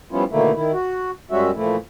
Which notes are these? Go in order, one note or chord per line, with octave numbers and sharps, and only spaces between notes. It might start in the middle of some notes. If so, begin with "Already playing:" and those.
F3 G3 B3 C#4 E4 F4
B2 D3 D#3 A3 A#3 E4
D#3 E4
F#4
F#2 G3 G#3 C#4 F#4 E5
A#2 E3 F3 A3 E4